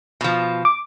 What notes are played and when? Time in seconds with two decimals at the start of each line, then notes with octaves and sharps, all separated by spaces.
0.21 B2 F3
0.65 D6